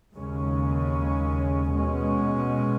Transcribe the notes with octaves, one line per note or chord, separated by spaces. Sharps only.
D#2 C#3 G#3 C#4
B2 G#3 C#4